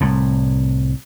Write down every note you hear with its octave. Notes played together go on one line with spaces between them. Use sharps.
C2 A2